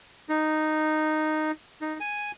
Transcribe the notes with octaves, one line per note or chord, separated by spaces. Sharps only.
D#4
D#4
G#5